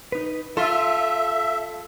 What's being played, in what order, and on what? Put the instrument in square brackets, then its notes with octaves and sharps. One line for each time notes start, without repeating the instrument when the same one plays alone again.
[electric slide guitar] D#4 B4
[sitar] F4 [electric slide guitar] A4 [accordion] E5